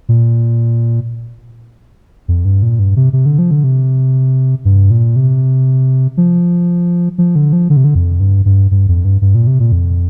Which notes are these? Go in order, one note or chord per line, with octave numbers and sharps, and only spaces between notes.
A#2
F2
G2
A#2
G2
C3
C3
D3
F3
D3
C3
G2
A#2
C3
F3
F3
D3
F3
D3
C3
D3
F2
G2
G2
G2
F2
G2
G2
A#2
C3
A#2
F2